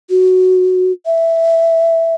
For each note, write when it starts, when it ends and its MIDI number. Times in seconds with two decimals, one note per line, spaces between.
0.10 0.92 66
1.06 2.15 76